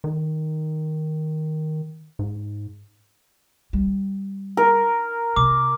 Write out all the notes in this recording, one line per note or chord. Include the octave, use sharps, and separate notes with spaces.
D#3
G#2
G3
A#4
C3 D6